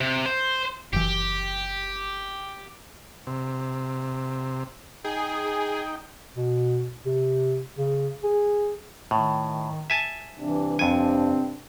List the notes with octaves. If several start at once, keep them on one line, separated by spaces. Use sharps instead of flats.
C3
C5
F#1 E3 G4
C3
D#4 G#4 G5
B2
C3
C#3
G#4
A2 D#3
E5 G#5 A5
G2 C3 E3 D4
F2 C4 G#5